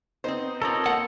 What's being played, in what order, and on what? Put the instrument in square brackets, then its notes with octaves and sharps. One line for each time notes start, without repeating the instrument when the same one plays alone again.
[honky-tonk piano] B3 D#4 [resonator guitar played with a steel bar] C4 C5
[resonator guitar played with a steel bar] C4 F4 A#4 [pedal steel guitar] A4 C#5 D#5
[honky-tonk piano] A#3 [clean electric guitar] F#5